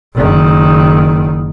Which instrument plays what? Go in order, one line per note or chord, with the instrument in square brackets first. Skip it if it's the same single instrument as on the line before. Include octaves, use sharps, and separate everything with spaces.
[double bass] F#1 D#3